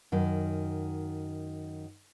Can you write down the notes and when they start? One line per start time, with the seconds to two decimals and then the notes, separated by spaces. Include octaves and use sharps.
0.12 F#2 D#3